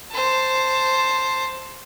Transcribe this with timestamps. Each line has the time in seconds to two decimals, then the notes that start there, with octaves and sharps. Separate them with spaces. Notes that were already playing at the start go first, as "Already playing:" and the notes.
0.11 C5 A5